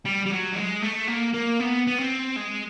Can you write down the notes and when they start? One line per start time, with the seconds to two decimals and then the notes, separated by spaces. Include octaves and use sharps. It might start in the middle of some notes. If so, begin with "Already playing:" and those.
0.05 G3
0.26 G3
0.31 F#3
0.53 G3
0.56 G#3
0.82 A3
1.07 A#3
1.34 A#3
1.60 B3
1.87 B3
1.98 C4
2.36 G#3